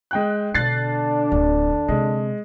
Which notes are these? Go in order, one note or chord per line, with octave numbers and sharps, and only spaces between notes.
G#3 G5 F#6
B2 D3 D4 F#6 A6 C7
D1
C3 G#3